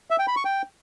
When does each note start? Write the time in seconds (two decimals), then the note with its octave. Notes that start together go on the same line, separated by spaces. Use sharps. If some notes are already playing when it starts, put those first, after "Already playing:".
0.10 E5
0.19 G5
0.28 B5
0.36 C#6
0.45 G5